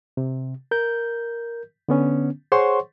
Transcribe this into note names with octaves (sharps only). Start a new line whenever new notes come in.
C3
A#4 G6
D3 B3 C#4
G#4 C5 C#5 F#5 C6 C#6